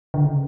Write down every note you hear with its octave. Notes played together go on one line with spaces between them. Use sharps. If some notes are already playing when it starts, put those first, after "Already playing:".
D3
C#3